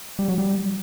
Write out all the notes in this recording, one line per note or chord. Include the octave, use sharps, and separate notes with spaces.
G3
F#3
G3